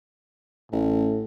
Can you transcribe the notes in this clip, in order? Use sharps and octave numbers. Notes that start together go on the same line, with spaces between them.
A1 A2